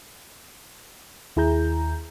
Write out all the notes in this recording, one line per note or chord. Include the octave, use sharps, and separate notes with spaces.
D#2 E4 G#4 A#5 G6